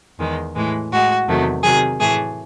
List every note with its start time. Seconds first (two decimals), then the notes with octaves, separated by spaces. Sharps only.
0.19 E2 D#3 G#3
0.56 A2 E3 G#3
0.91 A2 G#3 F#4
1.28 E2 C3 D#3 F#3 A3
1.63 C3 D#3 F#3 G#4
2.00 A2 E3 A3 G#4